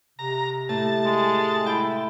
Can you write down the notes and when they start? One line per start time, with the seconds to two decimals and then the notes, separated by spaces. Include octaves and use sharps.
0.19 C3 A#5
0.69 A2 A5
1.04 G#3
1.66 E4 G5